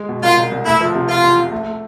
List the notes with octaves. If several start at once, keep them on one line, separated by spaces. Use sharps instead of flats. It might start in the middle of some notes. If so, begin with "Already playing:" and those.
Already playing: G#3
B2
C2 F4
C2
C2
A3 E4
F3
C3
F3 F4
E2
C3
A3
A3